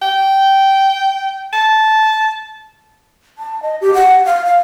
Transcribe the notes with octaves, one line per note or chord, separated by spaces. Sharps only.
G5
A5
A5
D#5
G4
F#5
F5
F5